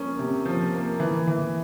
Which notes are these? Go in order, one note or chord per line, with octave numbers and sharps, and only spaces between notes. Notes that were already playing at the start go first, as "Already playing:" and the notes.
Already playing: F3 A#3 C#4
C3
F3
A#3
E3
E3